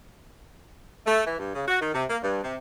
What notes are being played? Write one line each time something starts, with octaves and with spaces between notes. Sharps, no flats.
A3
E3
G2
C#3
F#4
D#3
C3
A#3
G2
C3